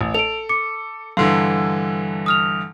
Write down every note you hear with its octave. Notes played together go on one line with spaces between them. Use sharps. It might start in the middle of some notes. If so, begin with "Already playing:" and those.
A1
A4 D7 F7
D6 C#7
G2 D3 E3 F5 C6 C7
D#6 F6 F7